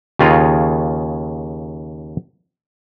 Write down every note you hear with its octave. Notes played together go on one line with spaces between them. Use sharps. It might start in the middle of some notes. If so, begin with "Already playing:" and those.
D#2 C#3 F4 G#4 C#5 A#5